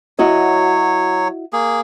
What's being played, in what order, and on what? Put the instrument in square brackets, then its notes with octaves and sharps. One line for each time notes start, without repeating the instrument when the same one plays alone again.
[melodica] F#3 C#5 [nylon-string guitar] E4 F#4 D#5
[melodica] A#3 G#4